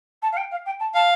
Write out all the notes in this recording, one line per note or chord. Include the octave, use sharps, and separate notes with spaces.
A5
F5
G5
F5
G5
A5
F5 A5